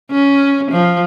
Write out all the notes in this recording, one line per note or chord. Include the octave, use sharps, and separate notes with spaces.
C#4
F3